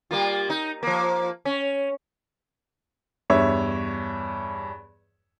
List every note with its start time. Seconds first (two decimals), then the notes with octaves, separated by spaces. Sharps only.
0.11 G3 A#3 F4
0.50 D#4
0.83 F3 A#3
1.45 C#4
3.30 E2 G2 C#5 E5